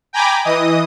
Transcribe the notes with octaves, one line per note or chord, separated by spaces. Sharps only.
G5 G#5 A#5 B5 D6
E3 D#5 D#6